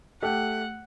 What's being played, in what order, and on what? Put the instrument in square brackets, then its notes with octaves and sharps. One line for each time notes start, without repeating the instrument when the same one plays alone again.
[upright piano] A3 G4 [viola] F#5